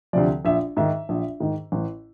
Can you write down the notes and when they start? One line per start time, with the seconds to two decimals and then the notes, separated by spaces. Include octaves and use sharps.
0.13 D2 C3 F3 D5
0.45 A#1 E5
0.77 G#2 D#3 E5
1.09 A#1
1.40 G#2 D#3
1.72 A1